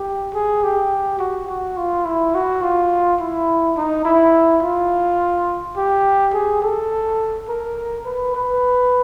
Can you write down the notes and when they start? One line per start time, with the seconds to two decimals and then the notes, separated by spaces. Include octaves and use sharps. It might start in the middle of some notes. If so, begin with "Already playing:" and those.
Already playing: G4
0.34 G#4
0.63 G4
1.19 F#4
1.49 F#4
1.77 F4
2.06 E4
2.35 F#4
2.63 F4
3.20 E4
3.77 D#4
4.05 E4
4.63 F4
5.77 G4
6.34 G#4
6.63 A4
7.49 A#4
8.06 B4
8.35 B4